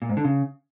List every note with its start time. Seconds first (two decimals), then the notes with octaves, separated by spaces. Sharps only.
0.02 A#2
0.09 G#2
0.17 D3
0.25 C#3